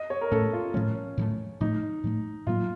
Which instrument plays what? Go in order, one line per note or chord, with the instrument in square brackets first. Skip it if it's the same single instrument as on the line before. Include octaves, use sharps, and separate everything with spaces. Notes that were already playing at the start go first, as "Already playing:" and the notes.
Already playing: [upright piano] D#5
C#5
A#4
[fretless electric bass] A2 A3 C#4 [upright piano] A4
[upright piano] F4
[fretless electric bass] A2 F3 A3 [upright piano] C#4
[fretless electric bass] A2 F3 A3
[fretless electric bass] A2 F3 A3 [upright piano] D#4
[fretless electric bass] A2 F3 A3
[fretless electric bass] A2 F#3 A#3 [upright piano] F4